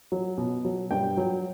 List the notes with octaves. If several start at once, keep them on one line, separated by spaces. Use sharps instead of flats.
F#3
B2
F#3
G2 G5
F#3